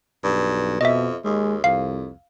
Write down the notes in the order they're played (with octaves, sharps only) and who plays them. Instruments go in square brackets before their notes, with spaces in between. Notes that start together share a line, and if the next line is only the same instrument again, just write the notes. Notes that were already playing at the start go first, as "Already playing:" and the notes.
[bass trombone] B1 [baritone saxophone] G2
[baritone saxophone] F2 [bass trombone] B2 [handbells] D#5 E5
[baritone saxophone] D#2 [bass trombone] G#3
[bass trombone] C2 [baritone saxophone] F2 [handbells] F5